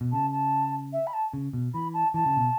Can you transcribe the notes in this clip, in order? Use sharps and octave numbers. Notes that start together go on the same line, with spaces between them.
B2
C#3 A5
A5
E5
B5
A5
C#3
B2
E3 B5
A5
E3 A5
C#3
B2